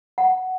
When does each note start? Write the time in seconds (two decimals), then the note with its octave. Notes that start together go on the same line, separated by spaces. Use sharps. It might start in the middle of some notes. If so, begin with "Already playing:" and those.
0.18 F#5